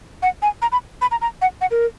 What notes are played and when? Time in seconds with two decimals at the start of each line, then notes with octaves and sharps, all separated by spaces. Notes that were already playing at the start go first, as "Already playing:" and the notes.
0.22 F#5
0.42 G#5
0.62 A#5
0.72 B5
1.02 B5
1.11 A#5
1.21 A#5
1.42 F#5
1.61 F#5
1.71 A#4